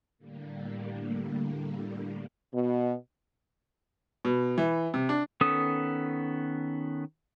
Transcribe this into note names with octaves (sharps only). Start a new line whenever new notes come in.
A2 D3 G3 A#3
B2
B2
E3
C3
D4
D#3 B3 C#4 A4 D#6